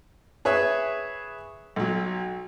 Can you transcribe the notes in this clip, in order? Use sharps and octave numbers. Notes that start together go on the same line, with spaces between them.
G#4 B4 C#5 E5
B1 F#3